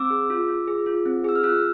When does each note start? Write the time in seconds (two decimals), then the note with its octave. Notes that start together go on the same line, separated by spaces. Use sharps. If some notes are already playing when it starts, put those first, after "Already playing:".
Already playing: C4 D6 E6
0.10 G#4
0.30 F4
0.48 F4
0.68 G#4
0.86 F4
1.06 C4
1.24 G#4 E6
1.35 F6
1.43 F4 E6 F#6